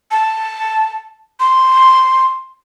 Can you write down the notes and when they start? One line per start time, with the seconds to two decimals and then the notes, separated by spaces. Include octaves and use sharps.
0.11 A5
1.40 C6